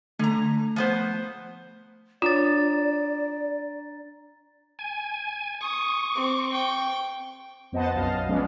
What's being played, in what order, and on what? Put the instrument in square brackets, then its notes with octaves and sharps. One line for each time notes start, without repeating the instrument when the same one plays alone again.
[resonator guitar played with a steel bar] D3 A#5 [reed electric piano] A3
[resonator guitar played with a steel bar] F3 B3 C5
[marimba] D4 C#5 [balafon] F4 [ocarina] D5 [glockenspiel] A#5 A6
[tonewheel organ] G#5
[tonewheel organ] C#6 [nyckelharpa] D#6
[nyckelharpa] C4 D6
G5
[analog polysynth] F2 B3 C5 D#5 F#5 A5
B1 F#2 D#5 F5 A5
F3 G#3 B3 C#4 D5